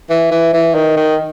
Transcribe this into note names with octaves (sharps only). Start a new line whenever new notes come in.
E3
E3
E3
D#3
D#3